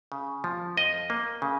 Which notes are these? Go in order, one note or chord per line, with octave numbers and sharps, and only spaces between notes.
C#3
F3
F2 D#5
A#3
C#3